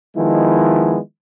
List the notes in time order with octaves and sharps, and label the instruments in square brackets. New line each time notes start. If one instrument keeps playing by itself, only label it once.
[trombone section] D#3 F3 G#3 B3 E4